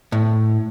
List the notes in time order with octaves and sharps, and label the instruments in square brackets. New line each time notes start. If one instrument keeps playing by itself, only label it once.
[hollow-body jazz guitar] A2